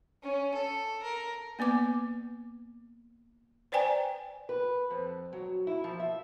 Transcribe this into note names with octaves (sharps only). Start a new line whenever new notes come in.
C#4
A4
A#4
A#3 B3 B4 D6
B4 C5 D5 G5 G#5 A#5
B4
F2
F#3
E4
F3
E5